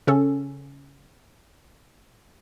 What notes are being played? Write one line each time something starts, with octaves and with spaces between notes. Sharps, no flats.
C#3 C#4 A4